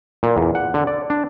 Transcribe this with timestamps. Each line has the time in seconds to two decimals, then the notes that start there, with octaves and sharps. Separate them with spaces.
0.23 A#2
0.37 E2
0.55 F#5
0.74 D3
0.87 D5
1.10 D4